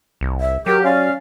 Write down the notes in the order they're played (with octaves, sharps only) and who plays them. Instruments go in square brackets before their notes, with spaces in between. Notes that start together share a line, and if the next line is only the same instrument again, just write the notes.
[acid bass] C2
[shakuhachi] E5
[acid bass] F#3 [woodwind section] G4 [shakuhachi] A#4
[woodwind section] C#4 F5 [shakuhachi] D5